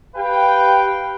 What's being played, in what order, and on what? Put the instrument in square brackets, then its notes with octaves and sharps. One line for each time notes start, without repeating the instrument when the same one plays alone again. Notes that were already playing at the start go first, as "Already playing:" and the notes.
[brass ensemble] G4 B4 F5 G5